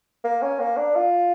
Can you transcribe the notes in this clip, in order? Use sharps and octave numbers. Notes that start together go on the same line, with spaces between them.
A#3
C#4
A#3
D4
F4